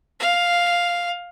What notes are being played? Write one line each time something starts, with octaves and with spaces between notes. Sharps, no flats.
F5